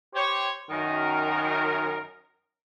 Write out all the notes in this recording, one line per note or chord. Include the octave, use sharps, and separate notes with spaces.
G4 C5 C#5
F#2 D#3 A#4